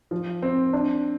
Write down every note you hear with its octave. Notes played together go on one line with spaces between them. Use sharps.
F3
C4
D4